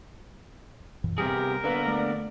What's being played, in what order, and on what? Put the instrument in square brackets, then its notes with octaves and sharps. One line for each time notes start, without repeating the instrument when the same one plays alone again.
[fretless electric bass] F#2 A#2 E3
[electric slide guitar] C3 B3 G#4 [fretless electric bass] G3 [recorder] G4 [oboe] A#4
[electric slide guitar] D3 A#3 B3 [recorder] B4
[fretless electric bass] A3 [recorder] D5